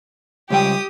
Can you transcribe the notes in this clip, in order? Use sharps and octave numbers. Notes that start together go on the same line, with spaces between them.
C#2 G3 G4 G5 D#6